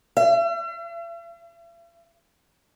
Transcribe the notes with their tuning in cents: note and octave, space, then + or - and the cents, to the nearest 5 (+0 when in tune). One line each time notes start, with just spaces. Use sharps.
E5 +45